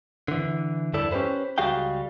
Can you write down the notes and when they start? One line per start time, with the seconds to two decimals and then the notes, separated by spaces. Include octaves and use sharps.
0.28 D3 E3
0.93 E2 G2 G3 E4 A4 D5
1.11 C#4 G4 A4 B4 C5
1.58 C#2 G3 F#4 G#4 F5 G5